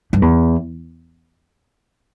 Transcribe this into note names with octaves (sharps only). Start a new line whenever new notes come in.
G2
E2